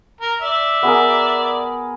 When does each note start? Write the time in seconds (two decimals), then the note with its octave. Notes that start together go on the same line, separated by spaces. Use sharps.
0.21 A#4
0.41 D5 E5
0.83 B3 G#4 A#4